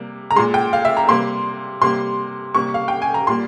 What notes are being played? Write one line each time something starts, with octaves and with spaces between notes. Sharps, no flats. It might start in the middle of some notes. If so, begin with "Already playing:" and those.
Already playing: C3 G3 A#3
A#5
A#2 G#3 C6
G5
F5
E5
A#5
C3 G3 A#3 C6
C3 G3 A#3 C6
C3 G3 A#3 C#6
F5
G5
G#5
A#5
A#2 G3 A#3 C6